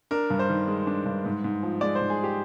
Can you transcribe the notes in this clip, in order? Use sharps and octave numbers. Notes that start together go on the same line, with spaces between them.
D4 A#4
G2
C5
D#3
G#3
D4
G2
G#2
G#2
F3
G#3 D5
C5
G#2
G#4
G4